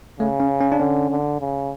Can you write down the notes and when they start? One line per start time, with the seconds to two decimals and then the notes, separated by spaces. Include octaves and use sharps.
0.20 C#3 A3
0.40 C#4
0.61 C#4
0.72 D4
0.80 D3 C#4
1.10 D3
1.40 C#3